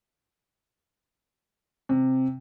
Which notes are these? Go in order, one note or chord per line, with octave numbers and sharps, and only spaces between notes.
C3